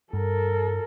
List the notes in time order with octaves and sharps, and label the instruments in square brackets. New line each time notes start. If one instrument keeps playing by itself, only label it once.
[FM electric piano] G2 [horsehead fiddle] A4 A#4